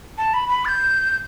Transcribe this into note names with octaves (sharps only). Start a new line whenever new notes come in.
A5
B5
B5
A6
G6